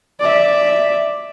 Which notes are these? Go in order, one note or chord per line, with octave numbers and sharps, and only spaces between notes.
D5 E5